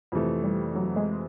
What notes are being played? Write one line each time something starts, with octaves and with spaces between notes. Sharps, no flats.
F2 C3 E3 A3
G3
F#3
G#3